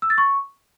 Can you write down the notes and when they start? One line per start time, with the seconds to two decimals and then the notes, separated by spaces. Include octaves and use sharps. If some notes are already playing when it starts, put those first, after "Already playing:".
0.02 E6
0.10 A6
0.18 C#6